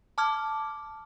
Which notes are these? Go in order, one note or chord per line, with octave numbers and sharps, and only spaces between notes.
A5 D6 F6 G#6